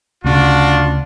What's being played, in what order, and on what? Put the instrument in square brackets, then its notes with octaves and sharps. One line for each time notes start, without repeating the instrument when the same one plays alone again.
[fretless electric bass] D2 C#3 [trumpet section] D4 F4 F#4